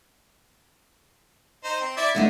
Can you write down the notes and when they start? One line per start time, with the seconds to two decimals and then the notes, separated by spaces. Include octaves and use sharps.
1.64 D#4 C5
1.80 C4
1.97 E4 D5 E5
2.15 E2 D3 A3 D#4